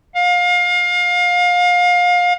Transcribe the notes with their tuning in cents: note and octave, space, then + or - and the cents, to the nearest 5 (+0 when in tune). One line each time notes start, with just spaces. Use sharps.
F5 +30